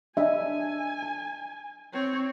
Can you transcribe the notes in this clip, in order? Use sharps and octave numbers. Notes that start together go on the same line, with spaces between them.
D4 D#5 E5 G#5
A5
C4 C#5